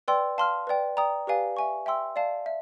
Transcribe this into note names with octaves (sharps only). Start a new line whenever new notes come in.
B4 D5 G5 C6 E6
F5 A5 C6 F6
B4 D5 G5
D5 G5 A#5 D#6
G4 B4 D5 F5 G#5
E5 G#5 C#6
E5 G5 C6 E6
D5 F5 A5
E5